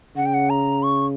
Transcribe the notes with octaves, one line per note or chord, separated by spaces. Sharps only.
C#3 F#5
G5
F#5
A#5
C#6